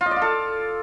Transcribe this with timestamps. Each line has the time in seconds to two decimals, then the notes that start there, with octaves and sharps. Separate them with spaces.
0.01 F4
0.06 D#5
0.11 D5
0.16 F4
0.22 A4